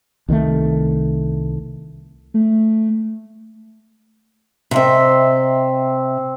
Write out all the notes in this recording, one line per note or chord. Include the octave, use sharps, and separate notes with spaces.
C2 D#3 G3 A3
A3
C3 C4 D#5 E5 C6